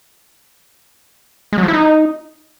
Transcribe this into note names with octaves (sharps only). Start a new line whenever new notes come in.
G#3
F#3
F3
E4
D#4